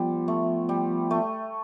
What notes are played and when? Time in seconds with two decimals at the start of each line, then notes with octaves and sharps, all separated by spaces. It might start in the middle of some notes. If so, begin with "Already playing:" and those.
Already playing: F3 G3 B3 F4
0.28 A3
0.69 G3
1.11 A3